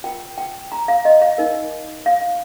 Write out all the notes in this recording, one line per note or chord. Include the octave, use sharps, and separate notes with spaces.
F4 A#4 G5
G5
A#5
F5
D#5
F5
D#4 A#4
F5